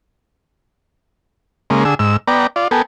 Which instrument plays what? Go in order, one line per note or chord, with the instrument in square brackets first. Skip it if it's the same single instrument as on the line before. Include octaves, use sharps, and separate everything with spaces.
[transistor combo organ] C#3 G#3 A#3
D3 G#4 E6
G#2 E6
B3 D5 G5 A#5
F4 D5
B3 A4 A#4 G5 G#5